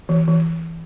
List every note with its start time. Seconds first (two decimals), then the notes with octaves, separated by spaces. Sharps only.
0.09 E3
0.28 E3